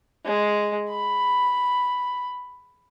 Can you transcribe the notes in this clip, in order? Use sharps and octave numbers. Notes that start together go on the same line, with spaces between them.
G#3
B5